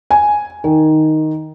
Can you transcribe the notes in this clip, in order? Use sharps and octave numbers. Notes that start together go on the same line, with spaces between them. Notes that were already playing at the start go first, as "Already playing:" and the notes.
G#5
D#3